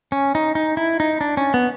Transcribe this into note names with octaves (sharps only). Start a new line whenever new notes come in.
C#4
D#4
D#4
E4
D#4
D4
C#4
B3